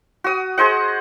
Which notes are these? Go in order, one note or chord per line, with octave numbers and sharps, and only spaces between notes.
F#4 D#6
G#4 C5 D#5 F#5